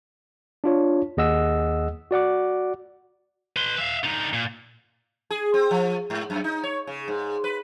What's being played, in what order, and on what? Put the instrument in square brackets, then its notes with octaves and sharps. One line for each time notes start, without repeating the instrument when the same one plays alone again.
[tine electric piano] D4 F4 C#5
D#2 G#4 D#5 F#5 E6
F#4 D5 F#5 D6
[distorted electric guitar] B4 C6
E5 F5
D3 D#4
A#2
[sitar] G#4
C4
F3
G#2
F#2
D#4
C#5
C#3
G#2
B4